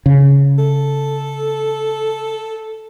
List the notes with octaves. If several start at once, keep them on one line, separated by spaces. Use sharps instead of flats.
C#3
A4